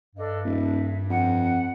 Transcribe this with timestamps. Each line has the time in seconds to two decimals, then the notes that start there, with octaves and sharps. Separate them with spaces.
0.16 G2 D4 A4 D#5
0.45 D#1 E5
1.10 F2 F#5